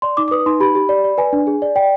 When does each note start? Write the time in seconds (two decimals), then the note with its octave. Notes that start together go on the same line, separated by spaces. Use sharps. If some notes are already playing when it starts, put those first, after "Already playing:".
0.02 D5 C6
0.17 D#4 D6
0.28 D6
0.31 B4 D#6
0.46 D#4 C6
0.60 G4 B5
0.75 G4
0.89 D5
1.04 D5
1.18 B4 G#5
1.33 D4
1.47 G#4
1.62 D5
1.76 D5 G5